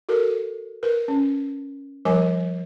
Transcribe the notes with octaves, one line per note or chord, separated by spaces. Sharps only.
F#4 A4 A#4
A#4 B4
C#4
F3 G3 A#4 G#5 D6